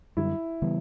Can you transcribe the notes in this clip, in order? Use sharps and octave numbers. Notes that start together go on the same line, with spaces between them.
F#2 D3 G3 E4
C#3 E3 G3 B3